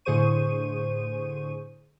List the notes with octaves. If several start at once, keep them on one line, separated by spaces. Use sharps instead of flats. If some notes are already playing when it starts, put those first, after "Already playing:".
A2 D3 G#4 C5 C#6 D#7